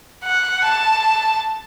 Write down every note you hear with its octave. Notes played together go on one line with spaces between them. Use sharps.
F#5
A5